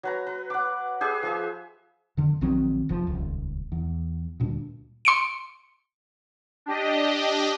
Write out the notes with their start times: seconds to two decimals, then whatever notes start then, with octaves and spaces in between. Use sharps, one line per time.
0.03 F#3 B4 A#5
0.27 B4
0.50 F#5 D6
1.01 G4 G#4 B4 E5
1.23 F3 G#4 E5
2.17 F2 D3
2.41 A#1 D#3 F#3 C4
2.89 F1 F3
3.07 D#1 C#2
3.72 E2
4.40 D2 A#2 G3 D4
5.05 C6 C#7 D7
6.66 D4 G4 D#5